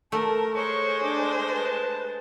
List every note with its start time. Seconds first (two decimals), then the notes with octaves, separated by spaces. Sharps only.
0.12 A3 A#4 A5
0.55 G#3 C5 C#5 C#6
1.03 D4 D6
1.49 B4 A5